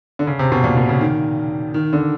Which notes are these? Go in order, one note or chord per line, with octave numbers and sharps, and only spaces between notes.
D3
C#3
C3
B2
A#2
B2
C#3
D#3
D#3
D3